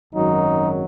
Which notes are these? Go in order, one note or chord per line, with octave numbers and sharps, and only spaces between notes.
G#1 F#2 D#3 F#3 D#4